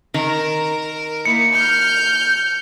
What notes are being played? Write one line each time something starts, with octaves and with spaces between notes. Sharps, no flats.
D#3 A#4
A#3 D#4 E4 C#7
F6 G6 C#7